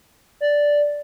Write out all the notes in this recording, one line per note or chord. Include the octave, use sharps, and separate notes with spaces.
D5